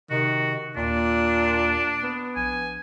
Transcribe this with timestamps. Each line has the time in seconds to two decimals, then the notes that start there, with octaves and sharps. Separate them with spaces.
0.10 C3 D#3 F#4
0.76 D#2 A#2 D4
2.03 B3
2.36 A#1 G#5